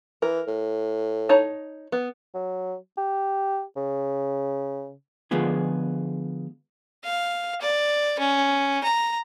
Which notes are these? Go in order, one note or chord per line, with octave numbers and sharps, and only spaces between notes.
E3 A#4
A2
D#4 C#5 A5
B3
F#3
G4
C#3
D3 F3 G#3 B3 F4 G#4
F5
D5
C#4
A#5